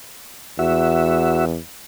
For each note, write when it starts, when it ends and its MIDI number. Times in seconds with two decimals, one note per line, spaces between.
0.59 1.57 40
0.59 1.45 66
0.59 1.45 76